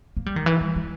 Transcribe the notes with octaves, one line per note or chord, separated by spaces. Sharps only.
A#3
G3
D#3
E3
G3
G#3